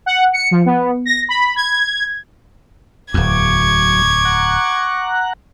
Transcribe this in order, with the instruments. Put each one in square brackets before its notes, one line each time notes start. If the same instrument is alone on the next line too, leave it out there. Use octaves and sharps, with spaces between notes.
[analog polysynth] F#5
C#7
F3
B3
A#6
B5
G#6
[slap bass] D1 E2 [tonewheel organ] F#3 [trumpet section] C#6 D6 [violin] G#6
[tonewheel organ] F#5 A#5 F#6